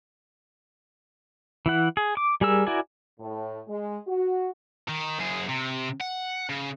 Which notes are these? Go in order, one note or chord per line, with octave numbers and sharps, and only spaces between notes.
E3 E4 F#5
G#4
D6
G3 G#4 A#4 E6
E4 F#4 A#4 D5 G#5
A2
G#3
F#4
D#3
F#2 G#4
C3
F#5
C#3